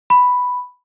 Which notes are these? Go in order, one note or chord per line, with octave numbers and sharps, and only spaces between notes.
B5